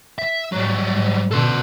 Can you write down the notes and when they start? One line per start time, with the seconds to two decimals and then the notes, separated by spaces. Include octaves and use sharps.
0.19 E5
0.52 G#2 F#3 G3
0.92 G#2
1.31 B2 D3 A4 C5